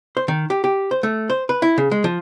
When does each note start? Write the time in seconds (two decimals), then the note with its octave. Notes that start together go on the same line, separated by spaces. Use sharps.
0.17 C5
0.28 D#3
0.50 G4
0.64 G4
0.91 C5
1.03 A3
1.30 C5
1.49 B4
1.62 E4
1.78 C#3
1.91 G#3
2.04 F3